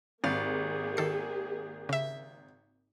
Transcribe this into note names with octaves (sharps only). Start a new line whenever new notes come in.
G#1 A#3 G4 G#4 F5 A6
D#3 A4 C7
C#3 E5